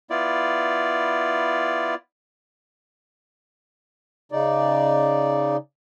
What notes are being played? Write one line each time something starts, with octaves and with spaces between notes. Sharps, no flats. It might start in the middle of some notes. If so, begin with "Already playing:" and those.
B3 E4 F4 D5
C#3 D#4 D5